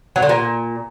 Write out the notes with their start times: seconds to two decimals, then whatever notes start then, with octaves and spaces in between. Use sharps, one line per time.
0.16 F#3
0.22 D3
0.29 A#2